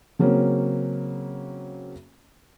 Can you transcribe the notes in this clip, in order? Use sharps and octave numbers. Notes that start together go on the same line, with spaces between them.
C#3 F#3 A#3 C4 C#4